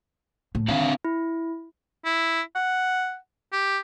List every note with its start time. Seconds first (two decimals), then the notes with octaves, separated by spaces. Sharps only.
0.55 A2
0.68 D#3 C4 D4 F5
1.04 E4
2.05 E4
2.55 F#5
3.52 G4